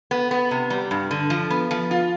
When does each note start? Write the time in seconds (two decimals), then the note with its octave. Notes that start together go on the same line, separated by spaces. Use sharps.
0.11 B3
0.31 B3
0.51 C3
0.70 G3
0.91 G2
1.11 D3
1.30 F3
1.50 B3
1.71 F3
1.91 F4